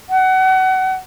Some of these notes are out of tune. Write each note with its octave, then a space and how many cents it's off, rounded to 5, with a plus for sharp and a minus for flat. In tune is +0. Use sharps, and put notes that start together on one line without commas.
F#5 +25